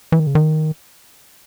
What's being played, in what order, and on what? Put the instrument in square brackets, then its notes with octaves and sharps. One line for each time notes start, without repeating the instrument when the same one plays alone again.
[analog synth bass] E3
D#3
C#3
D#3